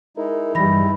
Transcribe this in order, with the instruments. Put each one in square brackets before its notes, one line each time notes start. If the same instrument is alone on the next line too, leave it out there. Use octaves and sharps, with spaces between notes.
[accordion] G#3 D#4 E4 [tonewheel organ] A#4
[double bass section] G2 G3 [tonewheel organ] E3 [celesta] B5 A#6